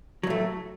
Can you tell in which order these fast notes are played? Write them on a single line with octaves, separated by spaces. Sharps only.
F#3 A2 A3